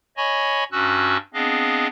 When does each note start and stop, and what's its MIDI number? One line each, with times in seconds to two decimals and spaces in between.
0.17 0.64 73
0.17 0.64 75
0.17 0.64 80
0.17 0.64 83
0.17 0.64 85
0.72 1.17 43
0.72 1.17 61
0.72 1.17 66
0.72 1.17 88
0.72 1.17 90
1.34 1.87 59
1.34 1.87 60
1.34 1.87 62
1.34 1.87 68
1.34 1.87 75
1.34 1.87 77